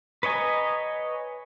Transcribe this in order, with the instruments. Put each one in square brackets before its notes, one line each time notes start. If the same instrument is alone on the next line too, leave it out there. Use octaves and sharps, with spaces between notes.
[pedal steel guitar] B4 C#5 D#5 G#5 A#5